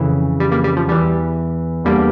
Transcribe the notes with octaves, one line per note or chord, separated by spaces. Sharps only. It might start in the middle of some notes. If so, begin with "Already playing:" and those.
Already playing: F2 C#3 E3
G3
G3 A#3
G3
F3
E2 E3 G3
E2 D3 G3 A#3